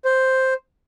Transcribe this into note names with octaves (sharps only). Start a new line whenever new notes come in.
C5